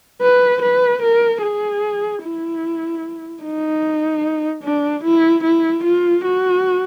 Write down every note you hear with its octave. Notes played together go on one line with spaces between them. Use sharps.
B4
B4
A#4
G#4
E4
D#4
D4
E4
E4
F4
F#4